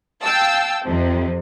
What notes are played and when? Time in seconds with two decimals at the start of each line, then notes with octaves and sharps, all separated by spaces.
0.24 F5 G5 A5 E6
0.84 F2 C3